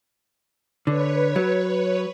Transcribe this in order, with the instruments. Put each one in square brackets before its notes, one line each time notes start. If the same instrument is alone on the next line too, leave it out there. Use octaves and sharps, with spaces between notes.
[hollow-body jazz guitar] D3 [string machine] B4 C#5
[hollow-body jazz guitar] F#3